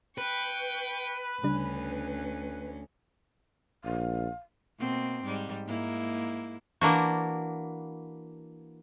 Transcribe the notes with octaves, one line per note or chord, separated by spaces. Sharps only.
B4 G5 C#6
D2 C#3 G3 C#4 D4
A#1 F5
B2 A#3 C4
G#2 G3
G#2 A#3 E4
E3 A#3 D4 F#4